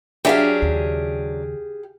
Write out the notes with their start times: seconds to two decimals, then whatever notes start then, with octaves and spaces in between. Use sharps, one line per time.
0.25 F#3 D4 G4 G#4 E5 F5
0.62 D#2 C#3